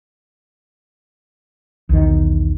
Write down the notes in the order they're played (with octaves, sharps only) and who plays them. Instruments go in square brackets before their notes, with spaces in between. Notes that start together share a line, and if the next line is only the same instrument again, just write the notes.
[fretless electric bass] B1 E2 D#3